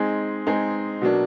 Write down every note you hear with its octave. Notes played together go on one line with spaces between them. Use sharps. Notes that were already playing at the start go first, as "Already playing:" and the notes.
Already playing: G#3 C4 D#4 G#4
G#3 C4 D#4 G#4
B2 F#3 A#3 D4